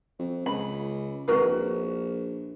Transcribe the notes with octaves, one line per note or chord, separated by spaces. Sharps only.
F2
C#2 B5
G#1 F#4 A#4 B4
A#1